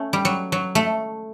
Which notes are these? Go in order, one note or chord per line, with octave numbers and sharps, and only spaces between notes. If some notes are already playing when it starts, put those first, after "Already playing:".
Already playing: A3 C#4
G3
F#3
F#3
A3